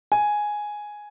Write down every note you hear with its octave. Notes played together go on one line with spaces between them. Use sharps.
G#5